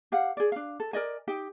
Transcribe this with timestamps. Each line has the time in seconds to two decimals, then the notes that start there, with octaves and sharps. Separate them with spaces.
0.12 G4 F5 F#5
0.37 G#4 D5
0.52 D4 F5
0.80 A4
0.93 A#4 D5 D#5 G#5
1.28 D#4 G4 G5